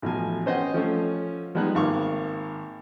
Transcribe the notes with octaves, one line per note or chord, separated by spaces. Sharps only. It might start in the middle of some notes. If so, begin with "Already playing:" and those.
A1 B2 F3 G#5
C#4 C5 D#5 F#5 G5
F3 A3 C#4
F3 G3 G#3 B3 D#4 F#6
G#1 A#3 F5 C#6 D6